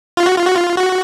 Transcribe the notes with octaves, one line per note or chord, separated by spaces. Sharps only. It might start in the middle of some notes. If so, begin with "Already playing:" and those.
F4
F#4
F4
F#4
F4
F#4